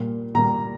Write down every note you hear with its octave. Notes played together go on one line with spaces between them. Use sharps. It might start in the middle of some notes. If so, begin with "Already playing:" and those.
Already playing: A#2 G3 A#3
A#2 G3 A#3 A#5